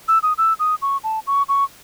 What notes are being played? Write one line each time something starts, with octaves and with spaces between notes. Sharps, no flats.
E6
D#6
E6
D#6
C#6
A5
C#6
C#6